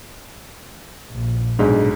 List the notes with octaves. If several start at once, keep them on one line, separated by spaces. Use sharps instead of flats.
A#1
B1 G#2 D4 G#4